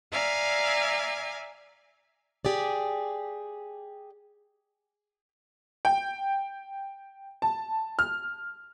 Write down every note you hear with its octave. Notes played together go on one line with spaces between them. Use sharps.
D5 E5 F5 G#5 A#5
G4 G#4 D5
G5
A5
F6